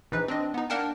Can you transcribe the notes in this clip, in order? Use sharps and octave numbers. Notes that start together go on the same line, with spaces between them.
A#1 E3 D#4 B4
C4 D4 D#5
B3 D#4
A#3 D4 A#4 F#5 G5 A5